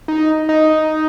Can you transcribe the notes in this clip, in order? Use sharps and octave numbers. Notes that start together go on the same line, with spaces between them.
D#4
D#4